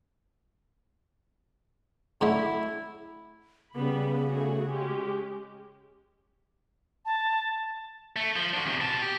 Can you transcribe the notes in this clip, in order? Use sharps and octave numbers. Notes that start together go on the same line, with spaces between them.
A2 D3 A3 E4
C#3 G3 B3 B5
A3 F#4 G#4
G#3 C#4 G4
A5
A3
F3
D4 F#4
E2 C3
B2 A5
G4